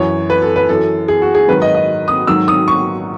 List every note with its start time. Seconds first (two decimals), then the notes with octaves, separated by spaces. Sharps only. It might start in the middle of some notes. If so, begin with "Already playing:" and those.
Already playing: F#2 E3 C#5
0.30 B4
0.42 A4
0.56 B4
0.69 F#2 E3 A4
1.08 G#4
1.22 F#4
1.35 G#4
1.47 G#2 D#3 F#3 B4
1.62 D#5
1.75 D#5
2.08 D#6
2.27 G#2 D#3 F#3 E6
2.48 D#6
2.68 C#6